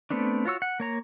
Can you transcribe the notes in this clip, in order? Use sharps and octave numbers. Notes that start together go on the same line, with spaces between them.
A3 B3 C4 D4
F4 F#4 C#5 E6
F#5
A#3 C#5 A#5